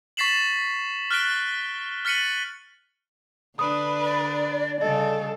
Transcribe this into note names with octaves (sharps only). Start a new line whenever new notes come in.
C#6 A6 B6 C7 E7 F#7
F6 F#6 A6 B6 D7 G7
F6 A6 B6 C#7 D#7 F#7
D3 D4 B4 D#6
D5
C#3 G3 A4 D#5